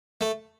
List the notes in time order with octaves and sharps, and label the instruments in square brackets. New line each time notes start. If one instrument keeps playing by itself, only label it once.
[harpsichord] A3